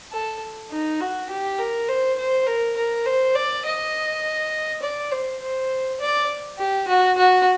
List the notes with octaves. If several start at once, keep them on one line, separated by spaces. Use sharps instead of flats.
A4
D#4
F#4
G4
A#4
C5
C5
A#4
A#4
C5
D5
D#5
D5
C5
C5
D5
G4
F#4
F#4